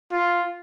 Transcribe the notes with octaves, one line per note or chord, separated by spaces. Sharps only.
F4